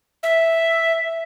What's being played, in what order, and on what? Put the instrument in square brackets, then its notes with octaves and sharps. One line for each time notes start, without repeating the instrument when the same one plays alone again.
[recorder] E5